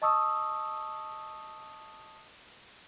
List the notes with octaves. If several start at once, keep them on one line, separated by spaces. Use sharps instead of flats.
D#5 A5 C#6 D#6 E6